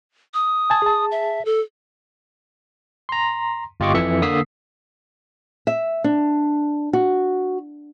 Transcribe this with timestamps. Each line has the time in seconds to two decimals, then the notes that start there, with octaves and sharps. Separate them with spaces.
0.34 D#6
0.70 G#5 A5 G#6
0.82 G#4 A5
1.11 E5
1.45 A4
3.09 A#5 C6
3.80 G1 F4 G4 D#5 C#6 D6
3.94 F2 E3 E5 C#7
4.22 D3 A#3 D#6 E6 B6 C7
5.67 E5
6.04 D4
6.93 F#4